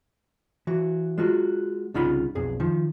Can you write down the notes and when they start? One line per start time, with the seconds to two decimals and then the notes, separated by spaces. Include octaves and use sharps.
0.67 E3 F#4
1.18 G#3 F4 F#4
1.94 C2 C#3 D#4 F4 F#5 B5
2.35 B1 F2 G#4
2.60 D#3 F3